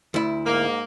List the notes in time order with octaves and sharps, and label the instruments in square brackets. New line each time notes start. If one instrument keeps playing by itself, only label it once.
[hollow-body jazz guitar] D2 E4
[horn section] G#2 A#3